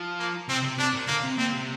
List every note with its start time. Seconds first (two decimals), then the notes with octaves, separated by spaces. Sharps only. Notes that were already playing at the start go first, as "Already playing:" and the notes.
Already playing: F3
0.19 A#3
0.48 C3 C4
0.64 C3
0.78 C3 D4
0.94 A#2
1.08 D3 A#3
1.24 C3
1.38 A#2 C4
1.53 C3